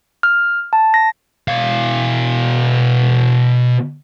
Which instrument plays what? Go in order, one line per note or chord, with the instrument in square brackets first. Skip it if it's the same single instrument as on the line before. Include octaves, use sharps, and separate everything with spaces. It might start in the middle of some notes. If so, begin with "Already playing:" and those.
[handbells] F6
A5
A#6
[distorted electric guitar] B2 F5